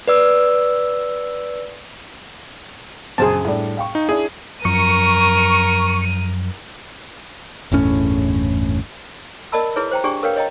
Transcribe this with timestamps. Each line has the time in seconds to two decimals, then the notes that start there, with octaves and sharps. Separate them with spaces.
0.08 B4 D5 E6
3.18 A#1 F#2 C#3 G#4 C5 A5
3.45 A2 G3 D4
3.77 F5 G5 C#6
3.95 D#4
4.09 D4 E4 G#4
4.65 F#2 F3 A#4 C#6 D#7
7.72 G1 E2 A2 C#4
9.52 A#4 D5 D#5 A5 B5 E6
9.76 E4 G#4 B4 C#5
9.91 C5 G5 A#5
10.04 D4 G4 G#4 D5 G5 C#6
10.23 A#4 B4 C#5 F5 G5
10.36 C#5 D#5 G5 A#5